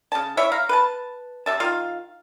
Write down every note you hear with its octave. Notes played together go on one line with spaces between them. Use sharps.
C#3 A5
E4 C#5 E5
F5 A#5
B4 A5
C3 E5 A5
D#3 F4 F5